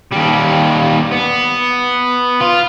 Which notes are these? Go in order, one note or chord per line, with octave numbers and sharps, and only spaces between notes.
D#2 G3
B3
F4